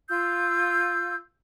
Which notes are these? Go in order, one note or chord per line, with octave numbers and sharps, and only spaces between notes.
F4 E6 G6